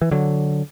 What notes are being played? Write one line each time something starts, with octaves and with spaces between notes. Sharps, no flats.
E3
D3 F#3